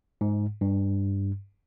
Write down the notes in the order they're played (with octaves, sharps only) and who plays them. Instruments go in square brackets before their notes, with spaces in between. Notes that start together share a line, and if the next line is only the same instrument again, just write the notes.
[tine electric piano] G#2
G2